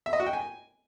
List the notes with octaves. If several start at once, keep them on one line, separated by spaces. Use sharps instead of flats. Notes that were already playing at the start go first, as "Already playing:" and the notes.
E5
D#5
F#4
G5
G#5